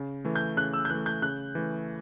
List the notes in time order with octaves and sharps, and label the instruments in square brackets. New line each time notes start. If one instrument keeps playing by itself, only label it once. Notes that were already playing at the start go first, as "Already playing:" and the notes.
Already playing: [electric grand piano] C#3
E3 A3
[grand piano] G6
[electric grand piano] C#3 [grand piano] F#6
[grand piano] E6
G6
[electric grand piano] E3 A3 [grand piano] F#6
[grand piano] G6
[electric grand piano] C#3 [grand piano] F#6
[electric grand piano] E3 A3